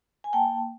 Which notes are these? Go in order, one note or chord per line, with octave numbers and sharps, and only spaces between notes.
G#5
A#3 G5 A5